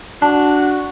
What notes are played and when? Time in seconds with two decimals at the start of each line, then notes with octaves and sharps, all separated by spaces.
0.22 D4 F#4 A5